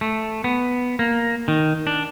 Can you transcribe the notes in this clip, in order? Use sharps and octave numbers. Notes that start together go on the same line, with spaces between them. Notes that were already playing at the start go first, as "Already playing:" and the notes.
A3
B3
A#3
D#3
D4